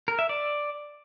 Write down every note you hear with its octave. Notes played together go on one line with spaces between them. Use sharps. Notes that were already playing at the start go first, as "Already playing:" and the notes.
A#4
E5
D5